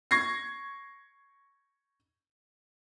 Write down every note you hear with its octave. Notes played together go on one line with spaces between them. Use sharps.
C#6 G#6 A#6 C7